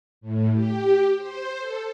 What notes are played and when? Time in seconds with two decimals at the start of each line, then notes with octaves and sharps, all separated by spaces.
0.21 A2
0.53 G4
1.15 C5
1.59 A4